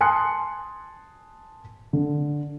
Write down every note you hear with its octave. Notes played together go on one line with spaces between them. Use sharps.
G#5 A5 C6 D#6 F#6 C#7
D3